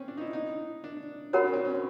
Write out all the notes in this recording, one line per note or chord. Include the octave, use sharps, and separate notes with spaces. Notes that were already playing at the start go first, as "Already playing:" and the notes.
Already playing: C4 C#4
D4
D#4
E4
D#4
D4
D4 F#4 A#4 C#5 F#5 B5
C#4
C4
C#4